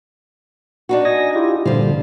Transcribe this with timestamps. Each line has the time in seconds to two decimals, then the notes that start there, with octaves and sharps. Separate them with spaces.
0.89 D4 D#4 F#4
1.05 D#5 G#5 A#6
1.36 E4 F4 G4
1.66 G2 A#2 D3 F3 G3